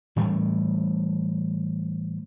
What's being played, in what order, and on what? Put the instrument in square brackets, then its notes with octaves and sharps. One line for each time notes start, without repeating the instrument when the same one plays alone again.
[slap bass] A2 E3 G3 A3